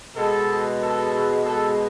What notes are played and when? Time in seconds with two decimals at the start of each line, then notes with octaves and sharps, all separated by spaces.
0.15 B2 G#3 A4
0.80 A4
1.45 A4